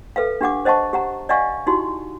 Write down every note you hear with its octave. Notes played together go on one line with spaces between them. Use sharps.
A4 B4 E5 F5
D4 G4 F#5 D6
C5 D#5 F#5 A5 C#6
G4 F#5 A#5
D5 D#5 F5 F#5 G#5 C#6
D#4 E4 F#4 G4 C6